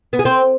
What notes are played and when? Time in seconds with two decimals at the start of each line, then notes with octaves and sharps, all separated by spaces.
0.13 B3
0.19 G#4
0.25 C4